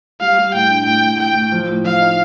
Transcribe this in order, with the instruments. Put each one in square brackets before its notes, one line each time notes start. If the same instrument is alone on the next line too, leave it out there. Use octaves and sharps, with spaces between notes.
[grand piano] G3 [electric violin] F5
[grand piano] G3
[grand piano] A2 [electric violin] G5
[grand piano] D4
[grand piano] A2 [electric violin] G5
[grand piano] A2
[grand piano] A2 [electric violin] G5
[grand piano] A2
F3
A2
[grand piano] F3 [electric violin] F5
[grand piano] D#4